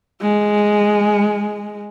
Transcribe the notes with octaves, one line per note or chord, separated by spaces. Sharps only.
G#3